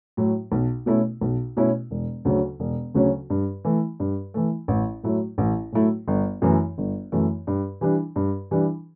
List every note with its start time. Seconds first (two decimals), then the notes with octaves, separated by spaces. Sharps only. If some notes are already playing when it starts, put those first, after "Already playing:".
0.17 A2 F#3
0.52 B1
0.86 B2 A3 C#4 E4
1.21 B1
1.57 B2 A3 C#4 E4
1.91 E1
2.25 D2 C#3 F#3 C#4
2.60 E1
2.94 D2 C#3 F#3 C#4
3.30 G2
3.65 E3 A3
4.00 G2
4.34 E3 A3
4.68 A1
5.03 A2 F#3 A3 E4
5.38 A1
5.72 A2 F#3 A3 E4
6.08 G1
6.42 F#2 E3 A3
6.78 G1
7.12 F#2 E3 A3
7.47 G2
7.81 E3 G3 D4
8.16 G2
8.51 E3 G3 D4